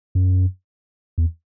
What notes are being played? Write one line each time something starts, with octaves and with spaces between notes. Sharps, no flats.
F#2
E2